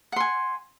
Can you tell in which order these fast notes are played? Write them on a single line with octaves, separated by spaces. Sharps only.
F#5 C6 G#5